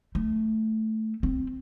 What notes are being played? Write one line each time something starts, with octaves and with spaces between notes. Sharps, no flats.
A3
C4